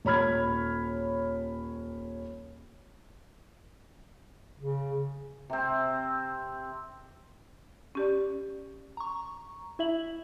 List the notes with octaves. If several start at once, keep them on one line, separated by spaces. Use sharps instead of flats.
D#1 C#5 B5 F6 G#6
C#3
C3 C4
C#4 G4 D5
A#5 C#6
E4 E5 F#7